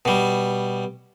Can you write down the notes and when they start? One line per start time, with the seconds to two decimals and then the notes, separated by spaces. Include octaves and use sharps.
0.05 B2 G3